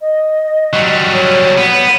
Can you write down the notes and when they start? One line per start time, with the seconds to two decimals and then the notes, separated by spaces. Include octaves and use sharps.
0.01 D#5
0.73 F#3 G3
1.14 C#5
1.58 B3